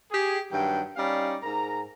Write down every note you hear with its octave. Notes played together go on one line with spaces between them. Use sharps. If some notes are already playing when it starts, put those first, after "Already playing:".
G4 G#4
G2 D#3 F#3 G5
G3 C#4 D#4 D5 F5
G#2 A#4 A#5